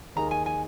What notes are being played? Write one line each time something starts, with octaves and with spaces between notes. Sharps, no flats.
D#2 D#3 A#3 G#4 A#5
G#5
G#5